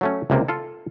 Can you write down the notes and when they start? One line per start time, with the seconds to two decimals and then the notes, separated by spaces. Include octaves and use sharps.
0.01 F#3 A3 C#4
0.30 C#2 C3 A#3
0.48 F4 A4